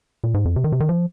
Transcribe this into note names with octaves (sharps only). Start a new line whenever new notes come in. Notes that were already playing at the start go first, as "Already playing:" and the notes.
A#2
G#2
F2
C3
D#3
C3
D#3
F3